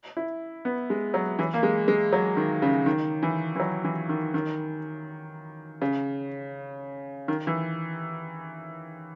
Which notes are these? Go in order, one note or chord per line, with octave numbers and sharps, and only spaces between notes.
E4
B3
G#3
F#3
E3
A#3
G#3
G#3
F#3
D#3
C#3
D#3
E3
E3
F#3
E3
D#3
D#3
C#3
D#3
E3